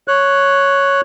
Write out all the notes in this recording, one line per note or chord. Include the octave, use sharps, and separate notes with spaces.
C#5 F#6